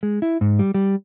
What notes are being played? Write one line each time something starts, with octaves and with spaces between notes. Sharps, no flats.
G#3
E4
G#2
G3
G3